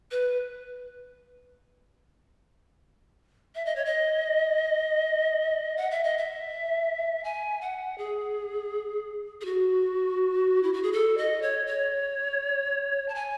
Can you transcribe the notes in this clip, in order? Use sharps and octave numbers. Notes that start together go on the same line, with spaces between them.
B4
E5
D#5
C#5
D#5
F#5
E5
D#5
E5
G#5
F#5
G#4
G#4
F#4
E4
F#4
G#4
A4
D#5
C#5
C#5
A5
G#5